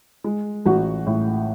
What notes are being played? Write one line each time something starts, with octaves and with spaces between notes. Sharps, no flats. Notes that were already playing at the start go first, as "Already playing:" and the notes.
G#3
A1 F#4
A2